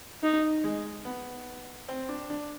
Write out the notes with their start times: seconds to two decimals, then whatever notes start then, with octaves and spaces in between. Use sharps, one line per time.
0.23 D#4
0.64 G#3
1.05 B3
1.88 C4
2.09 D4
2.30 D4